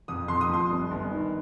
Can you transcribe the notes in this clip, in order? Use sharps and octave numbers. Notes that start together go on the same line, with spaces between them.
F2 D#6
F2 C6
D#6
F3 C6
G1
G1
D#3